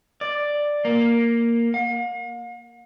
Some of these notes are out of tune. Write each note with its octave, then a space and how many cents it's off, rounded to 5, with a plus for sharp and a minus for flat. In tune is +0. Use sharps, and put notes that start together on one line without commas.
D5 +5
A#3 +0
F5 +45